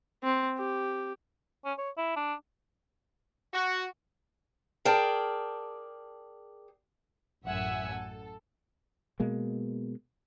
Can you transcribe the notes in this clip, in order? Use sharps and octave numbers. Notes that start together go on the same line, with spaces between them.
C4
G4
C#4
C#5
E4
D4
F#4
G#4 A#4 D5 G5 A5
A1 F#2 E5 F#5 G#5 E6
A4
B2 G#3 A#3